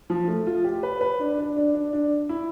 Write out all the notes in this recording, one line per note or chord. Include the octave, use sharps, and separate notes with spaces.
F3
A3
F4
G4
B4
B4
D4
D4
D4
D4
D4
E4